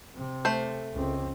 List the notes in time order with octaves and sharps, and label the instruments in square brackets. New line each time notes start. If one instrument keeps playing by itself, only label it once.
[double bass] C3
[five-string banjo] A3 C5
[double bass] C#2 C4